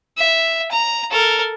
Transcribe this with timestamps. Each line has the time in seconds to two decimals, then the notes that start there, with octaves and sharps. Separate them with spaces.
0.18 E5
0.71 A#5
1.11 A4 A#4